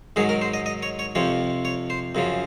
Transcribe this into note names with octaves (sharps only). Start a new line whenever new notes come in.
G#2 D#3 F#3 G#4
A#4
C5
D#5
D#5
C#5
C#5
F2 C3 F3 C#5
C#5
C5
F#2 C#3 F3